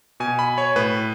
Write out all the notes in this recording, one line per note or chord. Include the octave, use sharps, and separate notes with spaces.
B2 G#5
B5
C#5
A2 B4